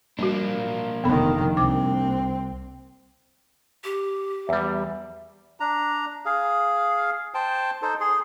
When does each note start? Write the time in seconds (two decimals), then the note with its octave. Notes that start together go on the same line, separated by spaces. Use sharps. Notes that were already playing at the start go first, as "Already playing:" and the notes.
0.19 G3 A#3 D4 F#4
1.04 F1 D#3 B3 A4 B5
1.57 C2 C4 D6
3.84 G4
4.49 E2 G3 E5
5.60 D4 A#5
6.25 G#4 F5
7.34 C5 G5 A5
7.82 D#4 A4 C5
8.00 G#4 C6